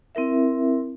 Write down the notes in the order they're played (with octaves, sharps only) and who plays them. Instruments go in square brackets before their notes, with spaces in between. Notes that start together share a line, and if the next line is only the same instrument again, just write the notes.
[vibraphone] C4 E4 A#4 E5